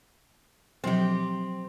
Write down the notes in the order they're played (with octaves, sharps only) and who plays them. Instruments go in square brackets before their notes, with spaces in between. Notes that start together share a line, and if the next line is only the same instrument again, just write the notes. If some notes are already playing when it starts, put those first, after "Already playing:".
[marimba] B2 F3 F#3 [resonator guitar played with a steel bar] C4 G4